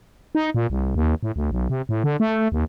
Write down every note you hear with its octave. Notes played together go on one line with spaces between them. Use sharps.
D#4
A#2
C2
D#2
A2
D2
B1
C3
A2
D3
A3
D#2